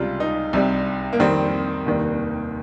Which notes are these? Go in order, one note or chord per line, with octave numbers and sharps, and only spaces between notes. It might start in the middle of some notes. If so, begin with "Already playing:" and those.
Already playing: C#2 C3 G3 F4
D#4
C2 C3 G3
A#3
F2 D#3 G3 C4
F1 D#2 D#3 G3